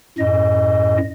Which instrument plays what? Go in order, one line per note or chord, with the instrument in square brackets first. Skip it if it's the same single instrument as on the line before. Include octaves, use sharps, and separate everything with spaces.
[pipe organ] F#2 A2 D#5